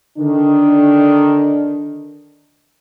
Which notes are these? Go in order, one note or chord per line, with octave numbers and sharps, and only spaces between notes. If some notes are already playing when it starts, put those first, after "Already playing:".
D3 D#3 D4